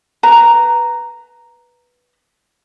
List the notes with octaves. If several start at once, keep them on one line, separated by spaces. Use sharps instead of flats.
B4 A#5